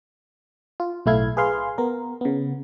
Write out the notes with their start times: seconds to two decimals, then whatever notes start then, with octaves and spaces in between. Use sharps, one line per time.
0.80 F4
1.06 B1 A2 A3 E4 F5 G#6
1.37 G#4 B4 F5 C6
1.78 B3 A#4
2.21 C#3 B3